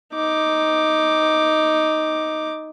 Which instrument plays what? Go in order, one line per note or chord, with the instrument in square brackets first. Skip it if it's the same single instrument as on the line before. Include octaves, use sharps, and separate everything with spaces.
[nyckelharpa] D#4 D6